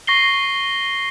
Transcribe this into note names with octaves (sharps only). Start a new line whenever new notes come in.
C#6 A#6 C7 G7